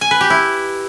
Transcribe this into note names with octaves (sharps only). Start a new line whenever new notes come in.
G#5
B4
G4
E4